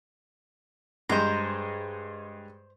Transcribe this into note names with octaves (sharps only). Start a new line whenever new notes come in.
G2 G#3 C5 D#5 A#5